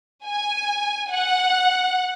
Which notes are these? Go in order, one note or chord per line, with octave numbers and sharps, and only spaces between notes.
G#5
F#5